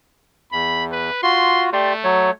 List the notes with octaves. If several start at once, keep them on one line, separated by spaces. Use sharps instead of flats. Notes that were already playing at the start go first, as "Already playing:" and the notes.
E2 B5
B4
F4 F#4 C6
A3 G4 D5 C6
F#3 C#5